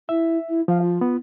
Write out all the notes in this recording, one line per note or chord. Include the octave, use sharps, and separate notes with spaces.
E4 E5
E4
F3 F5
F4
B3